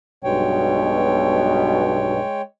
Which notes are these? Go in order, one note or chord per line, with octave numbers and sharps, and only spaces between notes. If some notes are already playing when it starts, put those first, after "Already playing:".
B1 G2 B2 G#3 C#5 G5